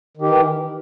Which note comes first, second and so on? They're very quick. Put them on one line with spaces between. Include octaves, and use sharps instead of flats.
D#3 G4 E3